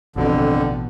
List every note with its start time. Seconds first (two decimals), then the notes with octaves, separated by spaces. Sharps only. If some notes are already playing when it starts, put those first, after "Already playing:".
0.16 A1 F2 B2 D3